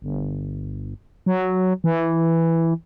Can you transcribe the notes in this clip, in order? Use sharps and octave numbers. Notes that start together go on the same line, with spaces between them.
G1
F#3
E3